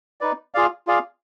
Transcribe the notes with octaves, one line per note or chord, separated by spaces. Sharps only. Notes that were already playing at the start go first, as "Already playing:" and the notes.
D#4 B4 D5
F4 G#4 D5 F5
F4 G#4 D5 F5